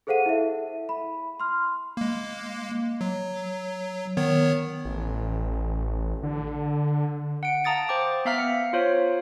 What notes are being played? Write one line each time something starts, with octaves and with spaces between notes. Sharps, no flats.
G#4 A4 C5 F5 F#5 D#7
E4 E5
B5
C6 F6
G#3 A#3
F#3
D#3 B3 C#5
A1
D3
F#5 D7
F5 A5 A#5 D#6 A6 D7
C5 G5 D6
B3 E5 F5 A#5 F6 B6
C#7
F4 C5 C#5 F5